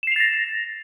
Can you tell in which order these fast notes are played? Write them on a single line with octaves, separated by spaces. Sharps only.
E7 C7 F7 A6 A#6